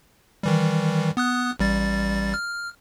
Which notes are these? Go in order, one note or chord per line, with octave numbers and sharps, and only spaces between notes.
D#3 E3 G3
B3 D#6 F#6
A1 G3 A6
F6